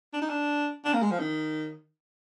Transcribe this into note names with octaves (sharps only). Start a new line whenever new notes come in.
D4
D#4
D4
D4
A#3
G#3
F3
D#3